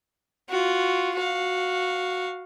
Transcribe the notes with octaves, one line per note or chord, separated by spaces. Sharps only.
F4 F#4
F#4 F5